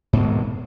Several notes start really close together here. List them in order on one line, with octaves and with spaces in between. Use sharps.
G#2 B2 G#3 D#3